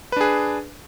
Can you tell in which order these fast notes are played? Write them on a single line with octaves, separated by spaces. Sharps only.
B4 D4 G#4